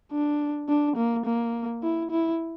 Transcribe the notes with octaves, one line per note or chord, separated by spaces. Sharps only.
D4
D4
A#3
A#3
E4
E4